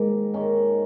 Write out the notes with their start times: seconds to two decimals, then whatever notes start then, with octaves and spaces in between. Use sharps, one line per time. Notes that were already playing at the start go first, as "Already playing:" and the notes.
Already playing: G#2 D#3 G#3 A#3
0.34 G#2 D#3 G#3 C#4